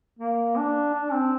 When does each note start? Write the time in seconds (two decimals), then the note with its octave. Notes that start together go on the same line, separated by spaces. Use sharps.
0.19 A#3
0.58 D4
0.94 D4
1.13 C4